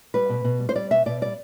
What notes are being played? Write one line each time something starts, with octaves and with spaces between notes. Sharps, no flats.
G3 B4
B2
B2
G3
C5
G3 D5
B2 E5
B2 D5
G3 D5